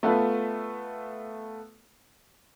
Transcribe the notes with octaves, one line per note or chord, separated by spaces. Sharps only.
A3 B3 F4 A4 B4